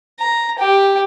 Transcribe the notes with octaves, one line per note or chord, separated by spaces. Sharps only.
A#5
G4